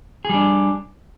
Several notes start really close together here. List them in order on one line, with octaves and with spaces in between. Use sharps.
G#4 G3 D4